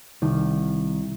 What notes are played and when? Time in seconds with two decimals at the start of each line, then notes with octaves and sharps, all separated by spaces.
0.22 C2 D#3